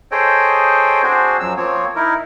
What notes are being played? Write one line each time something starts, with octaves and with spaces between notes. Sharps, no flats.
G#4 A4 C5 C#5 D#5 G5
C4 D4 F#4 G#4 C5
F#2 F3 F#3 E6
F3 A#3 C4 C#5
D#4 E4 A#4